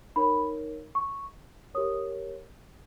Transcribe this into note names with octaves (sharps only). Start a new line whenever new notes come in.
D#4 A#4 C#5 B5
C#6
G4 A#4 C#5 D#6